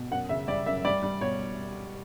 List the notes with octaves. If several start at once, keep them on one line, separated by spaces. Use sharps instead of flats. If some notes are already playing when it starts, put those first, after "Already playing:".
Already playing: B2
F#2 F#5
C#3 E5
G3 D5
F#2 E5
G3 D5
G3
B2 C#5